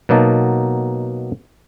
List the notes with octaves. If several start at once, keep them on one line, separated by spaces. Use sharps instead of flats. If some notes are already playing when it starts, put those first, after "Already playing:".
B2 F#3 A#3 D#4 A5